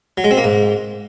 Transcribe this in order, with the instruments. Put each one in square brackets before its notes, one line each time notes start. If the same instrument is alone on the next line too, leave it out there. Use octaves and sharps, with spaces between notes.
[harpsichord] F#3
G#3
C4
A#3
G#2